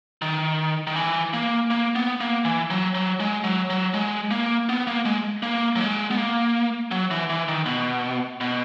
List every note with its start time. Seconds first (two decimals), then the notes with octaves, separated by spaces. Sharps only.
0.22 D#3
0.87 D#3
0.96 E3
1.33 A#3
1.70 A#3
1.95 B3
2.20 A#3
2.45 E3
2.70 F#3
2.95 F#3
3.20 G#3
3.44 F#3
3.70 F#3
3.94 G#3
4.31 A#3
4.69 B3
4.87 A#3
5.05 G#3
5.43 A#3
5.76 F#3
5.81 G#3
6.11 B3
6.17 A#3
6.91 F#3
7.11 E3
7.30 E3
7.48 D#3
7.66 B2
8.41 B2